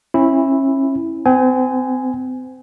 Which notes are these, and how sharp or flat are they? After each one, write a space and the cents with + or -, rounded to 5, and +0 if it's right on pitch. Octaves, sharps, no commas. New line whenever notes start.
C#4 -35 E4 +0
C4 -35 G#5 +0